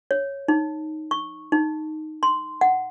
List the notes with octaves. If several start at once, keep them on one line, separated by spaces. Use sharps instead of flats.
C#5
D#4
C#6
D#4
C6
F#5